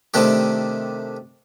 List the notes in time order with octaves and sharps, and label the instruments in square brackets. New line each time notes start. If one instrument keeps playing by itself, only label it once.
[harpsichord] C3 D#3 A3 D4 G4